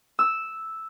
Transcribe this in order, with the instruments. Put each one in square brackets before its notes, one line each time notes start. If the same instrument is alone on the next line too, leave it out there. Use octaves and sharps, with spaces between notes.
[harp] E6